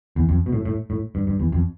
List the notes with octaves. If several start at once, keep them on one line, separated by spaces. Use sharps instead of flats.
E2
F2
B2
A2
A2
A2
G2
G2
E2
F2